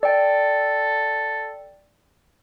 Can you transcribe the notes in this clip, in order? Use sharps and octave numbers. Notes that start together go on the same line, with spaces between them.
A4 D5 G5